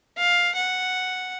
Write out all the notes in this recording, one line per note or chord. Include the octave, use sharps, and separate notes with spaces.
F5
F#5